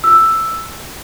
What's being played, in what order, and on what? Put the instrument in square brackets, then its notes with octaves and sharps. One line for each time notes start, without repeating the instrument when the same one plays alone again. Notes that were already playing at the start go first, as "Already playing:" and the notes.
[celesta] E6